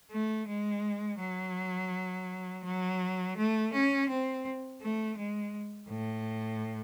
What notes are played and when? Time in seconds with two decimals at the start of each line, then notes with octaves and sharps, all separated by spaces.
0.11 A3
0.48 G#3
1.20 F#3
2.64 F#3
3.37 A3
3.73 C#4
4.09 C4
4.82 A3
5.18 G#3
5.89 A2